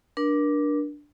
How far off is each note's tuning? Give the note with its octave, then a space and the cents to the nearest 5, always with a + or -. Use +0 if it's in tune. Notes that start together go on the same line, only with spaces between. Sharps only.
D4 +0 A#4 +35